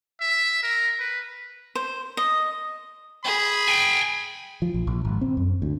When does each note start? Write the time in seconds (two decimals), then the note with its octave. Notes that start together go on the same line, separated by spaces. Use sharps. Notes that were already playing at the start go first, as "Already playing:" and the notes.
0.21 E5
0.63 A#4
1.00 B4
1.75 C5
2.17 D#5
3.24 G#4 B5
3.68 G5 G#5
4.62 F3
4.74 A#1
4.87 A#1
5.05 G#1
5.21 C4
5.37 F#2
5.62 D2